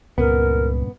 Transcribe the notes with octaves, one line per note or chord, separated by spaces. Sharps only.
C#2 G2 A#2 C#3 B3 A#4